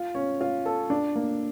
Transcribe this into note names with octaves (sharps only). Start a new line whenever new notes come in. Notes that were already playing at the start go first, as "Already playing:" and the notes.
Already playing: F4
C#4
F4
A4
D4
A#3